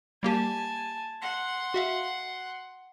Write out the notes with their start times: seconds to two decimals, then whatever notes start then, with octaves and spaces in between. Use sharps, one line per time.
0.23 G3 A#3 G4 G#5 A5
1.22 F#5 C6
1.74 F#4 E5 F5